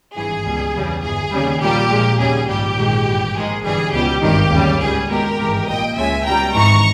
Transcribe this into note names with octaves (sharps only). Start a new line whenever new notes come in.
G#1 G2 E3 G#4
C#2 B2 G3
E2 C#3 G3
G1 G2 E3 G#4
D#2 C#3 G3
A#1 A#2 G3 G4
A#1 A#2 G#3
D#2 C#3 G3 G#4
A#1 G#2 G3 G4
A#1 G#2 D#3 G#3
G#1 G2 E3 G3
A#1 G#2 D#3 G#3 G#4
G1 G2 E3 G3 G#4
C#2 B2 G3 G4
G#1 G2 D#3 G4
D#2 C#3 G3
C#2 C#3 G3 G#4
C#2 B2 G#3 G4 A#4
G#1 G2 E3 G#3
A#1 A#2 G3 D#5 G5
C#2 C#3 G#3 E5 G#5
C#2 B2 G3 G5 A#5
G#1 G#2 E3 A#5 C#6